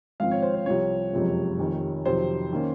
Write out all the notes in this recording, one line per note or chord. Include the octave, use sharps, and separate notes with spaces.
G#1 G#2 F3 C4 F5
C#5
C5
C5
C2 C3 F3 C4 C#5
F#1 F2 C3 F3 G#3
F1 F2 C3 D#3
F2 C3 D#3 F#3 C5
D#3 A#3 C#4